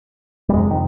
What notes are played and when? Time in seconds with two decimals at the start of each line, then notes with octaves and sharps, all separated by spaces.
0.49 G3
0.54 F2 C3 G#3
0.71 D#3